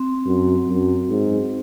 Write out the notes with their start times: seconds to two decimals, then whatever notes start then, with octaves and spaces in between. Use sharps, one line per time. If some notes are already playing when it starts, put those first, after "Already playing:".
Already playing: C4
0.26 F#2
0.67 F#2
1.09 G#2